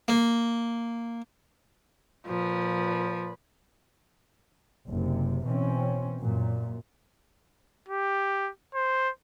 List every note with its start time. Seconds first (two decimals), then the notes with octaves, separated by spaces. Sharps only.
0.08 A#3
2.26 A#2 F3 B4
4.88 F#1 C3
5.45 B2 E3 C4 C#4
6.22 F#2 A#2
7.88 G4
8.75 C5